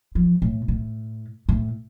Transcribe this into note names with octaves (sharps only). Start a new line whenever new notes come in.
F3
A2
A2
A2